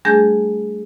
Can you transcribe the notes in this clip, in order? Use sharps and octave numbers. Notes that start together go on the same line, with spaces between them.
G3 A3 D4 G#4 G#5 G6